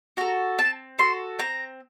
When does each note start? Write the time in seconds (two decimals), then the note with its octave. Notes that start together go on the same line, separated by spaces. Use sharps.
0.17 F#4 A4 A#5
0.58 C4 A5
0.98 F#4 A4 C6
1.39 C4 A#5